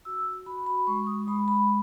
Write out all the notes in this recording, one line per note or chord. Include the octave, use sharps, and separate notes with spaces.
F#4 E6
F#4 B5
B5
G#3 C#6
D#6
G#3 B5
B5